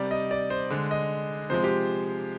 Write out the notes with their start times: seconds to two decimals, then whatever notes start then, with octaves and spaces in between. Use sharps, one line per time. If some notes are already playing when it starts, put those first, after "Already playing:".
Already playing: C3 G3 D5
0.11 D#5
0.31 D5
0.50 C5
0.71 D3 G#3
0.91 D#5
1.50 C3 F3 G#3 C5
1.64 G4